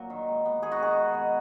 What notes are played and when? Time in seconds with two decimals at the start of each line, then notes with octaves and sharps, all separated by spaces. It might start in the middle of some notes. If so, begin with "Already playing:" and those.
Already playing: A#2 F#3 A#3 F#4
0.10 D#3
0.28 G#3
0.46 B3
0.63 D#3 G#4
0.72 F#4
0.79 D#3 G#4
0.97 G#3
1.14 B2